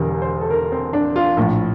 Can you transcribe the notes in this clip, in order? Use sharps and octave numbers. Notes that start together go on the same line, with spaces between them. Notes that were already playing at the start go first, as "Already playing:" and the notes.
Already playing: E1 E2 D3 G3 A#4
C5
A4
A#4
C4
D4
F4
A#1 A2 F3